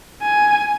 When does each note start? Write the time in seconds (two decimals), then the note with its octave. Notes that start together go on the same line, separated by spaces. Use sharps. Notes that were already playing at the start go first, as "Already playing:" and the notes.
0.22 G#5